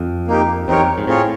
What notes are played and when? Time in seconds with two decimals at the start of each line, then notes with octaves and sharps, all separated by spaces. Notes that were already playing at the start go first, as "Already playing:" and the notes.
Already playing: F2
0.27 A#3 D#4 G4
0.68 E2 C4 D#4 G4 A#4 C#5
0.78 F2
0.98 G#2
1.07 A2 C4 F4 G#4 C#5